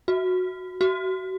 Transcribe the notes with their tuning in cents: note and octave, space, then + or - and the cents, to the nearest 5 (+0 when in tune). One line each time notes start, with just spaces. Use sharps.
F#4 -5
F#4 +30